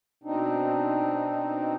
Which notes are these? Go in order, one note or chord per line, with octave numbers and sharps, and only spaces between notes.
B2 C4 D4 D#4